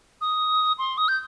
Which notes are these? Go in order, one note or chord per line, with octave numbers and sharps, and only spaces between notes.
D#6
C6
D#6
G6